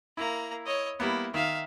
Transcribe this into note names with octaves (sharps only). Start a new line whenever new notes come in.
A#3 E4 A#5
C#5 D#5
G3 A#3 B3 E4
D#3 E5 F5